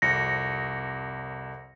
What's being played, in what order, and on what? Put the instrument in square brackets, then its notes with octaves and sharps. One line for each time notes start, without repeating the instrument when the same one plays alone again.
[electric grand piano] C2 F2 [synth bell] A#6 C#7